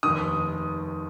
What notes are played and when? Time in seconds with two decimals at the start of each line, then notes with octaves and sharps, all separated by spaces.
0.03 F1 D#2 D#3 D#6